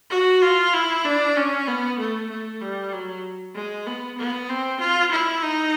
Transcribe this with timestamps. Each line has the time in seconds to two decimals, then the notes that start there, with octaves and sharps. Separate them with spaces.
0.10 F#4
0.42 F4
0.74 E4
1.05 D4
1.36 C#4
1.67 B3
1.99 A3
2.30 A3
2.61 G3
2.93 F#3
3.55 G#3
3.87 B3
4.17 B3
4.49 C4
4.80 F4
5.11 E4
5.43 D#4